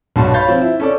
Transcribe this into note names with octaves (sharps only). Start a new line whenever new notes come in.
B1 G2 F#4 A5 C6
C#5 F5 B5 G6 A6
F3 C4
E4
C#4 A4 D5